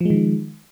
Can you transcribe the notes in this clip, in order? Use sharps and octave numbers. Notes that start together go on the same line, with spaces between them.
D#3 F3 G#3